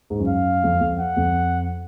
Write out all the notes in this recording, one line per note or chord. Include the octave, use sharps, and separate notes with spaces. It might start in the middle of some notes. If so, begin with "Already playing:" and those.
G#2
F#2
F5
F2
F2
F#5
F2